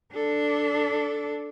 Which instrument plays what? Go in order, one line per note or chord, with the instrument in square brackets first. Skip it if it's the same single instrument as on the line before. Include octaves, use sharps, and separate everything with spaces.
[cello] D4 [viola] A4